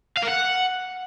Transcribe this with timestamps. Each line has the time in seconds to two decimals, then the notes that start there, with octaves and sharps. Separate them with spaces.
0.17 F5
0.22 A#4
0.28 F#5